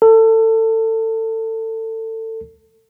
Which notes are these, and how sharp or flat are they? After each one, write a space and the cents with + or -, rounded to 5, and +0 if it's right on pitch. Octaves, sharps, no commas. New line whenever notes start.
A4 +25